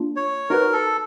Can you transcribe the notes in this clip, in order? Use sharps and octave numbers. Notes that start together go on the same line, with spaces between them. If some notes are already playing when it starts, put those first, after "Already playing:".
Already playing: A#3 D4 F4
C#5
D#4 F#4 A#4 B4
A4